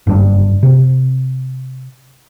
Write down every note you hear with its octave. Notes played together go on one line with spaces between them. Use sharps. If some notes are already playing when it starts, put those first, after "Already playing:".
F#1 G2 G3 D4
C3